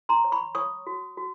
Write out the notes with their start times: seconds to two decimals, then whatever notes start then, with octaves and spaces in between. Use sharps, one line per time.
0.09 A#5 C6
0.24 C#5
0.32 B5 C#6
0.55 C#5 C#6 D#6
0.87 F#4
1.17 F#4